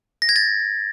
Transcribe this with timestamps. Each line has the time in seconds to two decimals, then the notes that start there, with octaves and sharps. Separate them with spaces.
0.22 A#6
0.29 G#6
0.36 A6